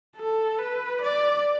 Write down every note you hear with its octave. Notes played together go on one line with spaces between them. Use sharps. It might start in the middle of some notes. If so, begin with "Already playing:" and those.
A4
B4
D5